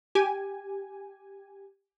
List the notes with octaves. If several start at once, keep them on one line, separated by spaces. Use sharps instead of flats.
G4 G#5